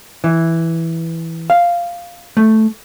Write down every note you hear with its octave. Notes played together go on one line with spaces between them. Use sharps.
E3
F5
A3